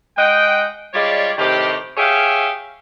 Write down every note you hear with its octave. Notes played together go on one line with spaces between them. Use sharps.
G#3 D#5 F#5 G5
G3 G#3 F4 C#5 D5
A2 C3 D#3 G4
G4 G#4 C#5 E5 F5